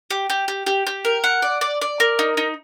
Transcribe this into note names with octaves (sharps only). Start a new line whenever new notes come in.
G4
G4
G4
G4
G4
A#4
F#5
D5
D5
D5
A#4
D#4
D#4